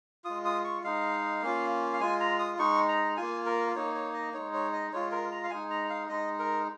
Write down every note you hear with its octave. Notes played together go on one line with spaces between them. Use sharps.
G#3 F4 D#6
D#6
C#6
G#3 D#4 F5
A#3 C#4 F4
F5
G#3 F4 G#5
A#5
D#6
G#3 D#4 C#6
A#5
A#3 F4 G#5
A#4
A#3 D#4 C#5
C#5
D#5
G#3 D#4 C#5
C#5
D#5
G#3 F4 C#5
A#4
A#5
F5
G#3 D#4 G#5
A#5
F5
G#3 D#4 D#5
A#4